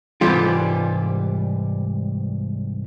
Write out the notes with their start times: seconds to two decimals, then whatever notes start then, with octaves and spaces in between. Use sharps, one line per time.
0.21 C2 G#2 E3 G3 F4